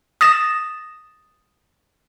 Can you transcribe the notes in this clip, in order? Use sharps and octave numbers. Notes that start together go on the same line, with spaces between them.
D#6 A6 A#6 E7